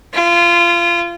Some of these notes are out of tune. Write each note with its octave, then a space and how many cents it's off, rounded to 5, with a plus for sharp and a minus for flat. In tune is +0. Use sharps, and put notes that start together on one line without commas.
F4 -25